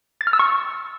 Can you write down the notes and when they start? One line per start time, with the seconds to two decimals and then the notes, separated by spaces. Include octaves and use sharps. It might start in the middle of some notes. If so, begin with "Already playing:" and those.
0.21 A6
0.27 F6
0.33 E6
0.39 C#6